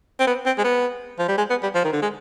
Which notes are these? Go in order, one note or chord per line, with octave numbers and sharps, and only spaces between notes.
C4
B3
C4
G#3
B3
F3
G3
G#3
B3
G3
F3
D#3
D3
G#3